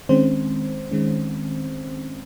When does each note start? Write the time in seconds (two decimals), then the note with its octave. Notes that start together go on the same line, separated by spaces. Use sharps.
0.09 D#3 G#3 C4 C#4 C5
0.91 D#3 G#3 C#4